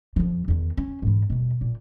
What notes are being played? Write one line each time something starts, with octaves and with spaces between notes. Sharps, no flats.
F2 F3
E2 D#3
C#4
G#2 E3
D#1 B2
A#2